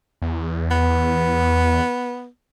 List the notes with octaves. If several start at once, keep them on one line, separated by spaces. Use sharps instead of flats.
E2
B3